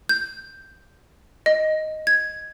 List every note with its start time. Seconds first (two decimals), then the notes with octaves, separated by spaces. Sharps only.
0.09 G6
1.46 D#5
2.07 G#6